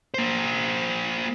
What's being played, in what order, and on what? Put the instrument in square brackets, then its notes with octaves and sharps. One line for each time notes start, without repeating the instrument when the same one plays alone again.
[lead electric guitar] A#3 C5